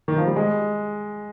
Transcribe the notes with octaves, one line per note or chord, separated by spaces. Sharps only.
D#3
F3
G3
G#3